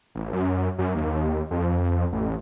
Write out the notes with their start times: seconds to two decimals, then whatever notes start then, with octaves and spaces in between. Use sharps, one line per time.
0.15 A1
0.33 F#2
0.78 F#2
0.95 D#2
1.51 F2
2.12 A1